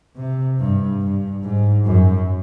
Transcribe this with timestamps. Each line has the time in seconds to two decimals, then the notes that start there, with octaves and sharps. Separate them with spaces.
0.16 C3
0.59 G2
1.01 G2
1.43 G#2
1.85 F#2